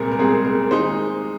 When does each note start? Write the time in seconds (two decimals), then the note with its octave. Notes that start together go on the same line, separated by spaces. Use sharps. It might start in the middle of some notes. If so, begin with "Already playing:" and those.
Already playing: C2 A#2 G#3 C4 A#4
0.12 A#4
0.19 C2 A#2 G#3 C4 G#4
0.45 A#4
0.71 D#3 G#3 D#4 C5